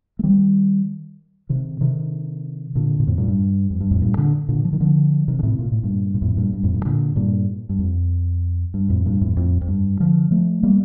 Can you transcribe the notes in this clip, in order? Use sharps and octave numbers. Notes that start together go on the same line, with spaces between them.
A3
D#3 G3
C3 D#3
C3 D#3
A#2 D3
A#2
F2 A2
G2 A#2
G2
F2
G2
F2 A2
G2 A#2
A#2 D3
A#2 D3
F3
D#3
D3 F3
C3 D#3
D3
A2 C3
A#2
A2
G2 A#2
A#2
F2 A2
G2 A#2
G2
F2 A2
G2 A#2
A#2 D3
G2 A#2
G2
F2
G2
F2 A2
G2 A#2
F2 A2
F2
F2
G2
D3 F3
F3 A3
G3 A#3